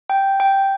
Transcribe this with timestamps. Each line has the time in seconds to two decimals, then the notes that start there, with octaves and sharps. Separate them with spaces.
0.10 G5
0.40 G5